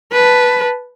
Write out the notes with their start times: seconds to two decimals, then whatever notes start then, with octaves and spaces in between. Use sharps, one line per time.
0.12 B4 A5